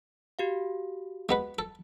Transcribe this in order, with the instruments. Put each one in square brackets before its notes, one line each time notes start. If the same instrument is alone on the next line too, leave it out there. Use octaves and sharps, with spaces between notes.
[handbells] F#4 G4 F5
[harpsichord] G#3 B3 B4
A4